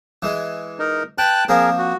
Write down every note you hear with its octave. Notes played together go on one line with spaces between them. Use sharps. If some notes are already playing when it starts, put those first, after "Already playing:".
E3 G#3
D#4 A#4
B4 G5 A5 F#6
F3 A#3 C4 G#4 A#4
F#4